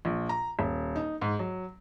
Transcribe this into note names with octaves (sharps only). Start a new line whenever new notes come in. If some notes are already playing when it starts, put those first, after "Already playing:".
A#1
A#5
D#1
D#4
G#2
F#3